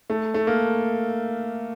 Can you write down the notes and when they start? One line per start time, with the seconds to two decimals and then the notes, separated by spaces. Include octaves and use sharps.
0.10 A3
0.34 A3
0.47 A#3